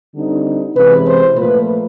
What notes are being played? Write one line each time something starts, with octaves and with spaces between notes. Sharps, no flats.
D3 G3 C4 D#4
C3 E3 G#3 C#4 B4
C5
A#2 F3 A3 B4